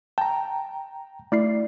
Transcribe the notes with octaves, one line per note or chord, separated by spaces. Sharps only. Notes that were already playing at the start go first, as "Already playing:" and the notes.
G5 A5 A#5
A3 E4 D5 C7